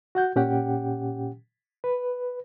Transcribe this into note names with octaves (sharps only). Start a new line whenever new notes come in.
F#4 F#5 G6
A#2 C#4 G4 F#5 G5
B4